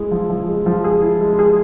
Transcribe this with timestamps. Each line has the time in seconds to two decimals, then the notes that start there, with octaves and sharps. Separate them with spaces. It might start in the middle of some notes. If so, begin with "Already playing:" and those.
Already playing: G#3 E4 G#4
0.11 F3
0.30 F3
0.48 G#3
0.66 F3
0.84 G#4
1.02 E4
1.21 G#3
1.39 G#4